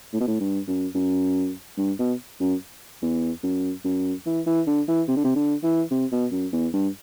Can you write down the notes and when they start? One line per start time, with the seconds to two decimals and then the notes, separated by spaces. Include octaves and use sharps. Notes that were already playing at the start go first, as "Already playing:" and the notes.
0.13 A2
0.20 B2
0.28 A2
0.40 G2
0.68 F#2
0.95 F#2
1.77 G2
1.99 B2
2.40 F#2
3.02 E2
3.43 F#2
3.84 F#2
4.26 E3
4.46 E3
4.67 D3
4.88 E3
5.08 C3
5.16 D3
5.24 C3
5.35 D3
5.63 E3
5.91 C3
6.12 B2
6.32 F#2
6.53 E2
6.74 G2